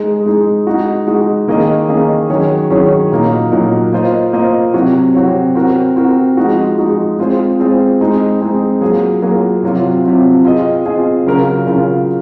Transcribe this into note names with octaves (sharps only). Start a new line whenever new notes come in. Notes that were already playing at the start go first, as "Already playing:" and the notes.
Already playing: G#3 D#4 G#4
G#3 D#4 G#4
G#3 D#4 F#4
G#3 D#4 F#4
D#3 A#3 C#4 G#4 D#5
D#3 A#3 C#4 G#4 D#5
D#3 F#3 C#4 G#4 C#5
D#3 F#3 C#4 G#4 C#5
A#2 F#3 A#3 D#4
A#2 F#3 A#3 D#4
A#3 F4 C5 D#5
A#3 F4 C5 D#5
C3 F#3 C4 F#4 C#5
C3 F#3 C4 F#4 C#5
C4 F#4 A#4
C4 F#4 A#4
F3 G#3 D#4 F#4
F3 G#3 D#4 F#4
G#3 C4 F4 G#4 C5
G#3 C4 F4 G#4 C5
G#3 C4 D#4 G#4
G#3 C4 D#4 G#4
F#3 A#3 F4 G#4
F#3 A#3 F4 G#4
C3 F#3 C4 F4
C3 F#3 C4 F4
C4 F4 G#4 D#5
C4 F4 G#4 D#5
C#3 F#3 C#4 F4 A#4
C#3 F#3 C#4 F4 A#4